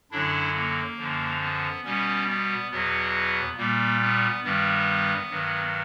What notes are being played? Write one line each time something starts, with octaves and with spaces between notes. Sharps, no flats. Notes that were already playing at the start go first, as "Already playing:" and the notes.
F#2 D3 F#3 D4 E4
A#3
F#2 D3 F3
B3
B2 G3 B3 C#4
B3
E2 B2 F#3 B3
A#2 G3 A#3
B3
G2 D#3 G3 B3
G2 D#3 F#3